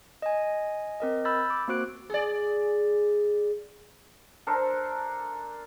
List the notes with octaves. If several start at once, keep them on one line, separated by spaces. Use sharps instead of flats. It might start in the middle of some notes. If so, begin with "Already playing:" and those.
D#5 G#5
C4 A#4 D#5
B5 E6 F6 G6 A6
D6
A#3 C4 F#4 C5 F#6 D7
G#4 D5
D4 A4 A#4 C5